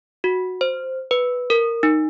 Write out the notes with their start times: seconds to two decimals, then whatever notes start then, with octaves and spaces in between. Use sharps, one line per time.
0.24 F#4
0.61 C5
1.11 B4
1.50 A#4
1.83 D#4